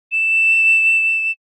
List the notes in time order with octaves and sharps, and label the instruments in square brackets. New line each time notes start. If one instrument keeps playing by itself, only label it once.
[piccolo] E7